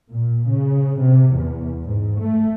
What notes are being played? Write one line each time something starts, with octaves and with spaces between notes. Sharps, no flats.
A#2
C#3
C3
E2
G#2
A3